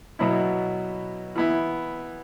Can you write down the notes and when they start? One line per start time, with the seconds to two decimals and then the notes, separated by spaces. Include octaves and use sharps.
0.19 B2 F#3 B3 E4
1.36 E3 B3 E4